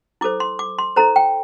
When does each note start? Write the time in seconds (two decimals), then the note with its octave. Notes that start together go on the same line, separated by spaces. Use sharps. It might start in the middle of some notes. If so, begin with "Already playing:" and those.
0.21 E4 A4 C5 D6
0.40 C6
0.59 D6
0.78 C6
0.96 E4 A4 C5 A#5
1.16 G5